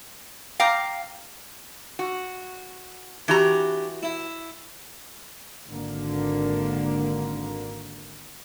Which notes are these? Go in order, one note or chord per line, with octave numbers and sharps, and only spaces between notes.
F5 G5 A#5 D6
F#4
E3 D4 F#4 G4 A#5
E4
G#1 D3 A#3